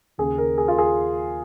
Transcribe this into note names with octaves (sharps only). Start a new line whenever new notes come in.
D#2 C#3 G#4
A#4
G#4
F4
G#4